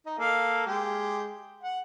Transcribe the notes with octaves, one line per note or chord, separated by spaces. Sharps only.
D#4
A#3 A4 F5
G#3 G4
F#5